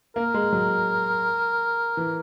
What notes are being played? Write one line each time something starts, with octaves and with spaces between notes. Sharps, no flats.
A#3 A#4
G#3
F#3
E3